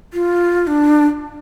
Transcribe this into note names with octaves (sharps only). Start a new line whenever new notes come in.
F4
D4